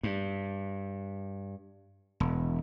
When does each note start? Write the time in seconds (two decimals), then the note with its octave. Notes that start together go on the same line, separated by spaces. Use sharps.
0.03 G2
2.20 E1